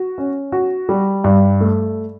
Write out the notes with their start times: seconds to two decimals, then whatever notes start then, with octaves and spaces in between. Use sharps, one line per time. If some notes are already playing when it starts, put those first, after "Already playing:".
Already playing: F#4
0.18 C#4
0.52 F#4
0.89 G3
1.24 G2
1.60 A3